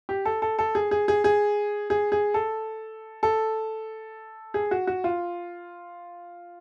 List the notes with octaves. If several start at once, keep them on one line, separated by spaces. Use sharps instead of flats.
G4
A4
A4
A4
G#4
G#4
G#4
G#4
G#4
G#4
A4
A4
G#4
F#4
F#4
F4